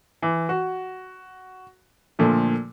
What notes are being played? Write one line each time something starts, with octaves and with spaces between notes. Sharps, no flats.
E3
F#4
A#2 D3 F3 A3